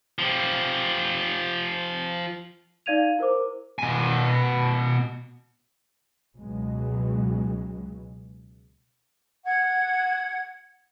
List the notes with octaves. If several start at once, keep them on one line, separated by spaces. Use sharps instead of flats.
F3 G4
D#4 D5 F5 G#6 D#7 F7
E4 A#4 C5 D6
B2 G#5
C#2 B2 F#3 G#3
F#5 G#6